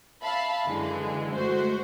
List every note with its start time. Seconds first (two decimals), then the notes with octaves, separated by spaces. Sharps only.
0.22 E5 F5 A5 B5
0.65 F#2 D3 E3 G#3
1.33 G#3 A3 F#4 C5